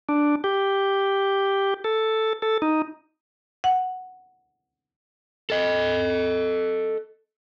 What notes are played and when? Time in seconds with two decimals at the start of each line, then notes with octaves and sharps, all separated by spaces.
0.09 D4
0.44 G4
1.84 A4
2.42 A4
2.62 D#4
3.64 F#5
5.50 A4 D#5